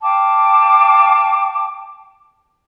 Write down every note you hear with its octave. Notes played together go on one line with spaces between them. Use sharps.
F5 G5 A5 D6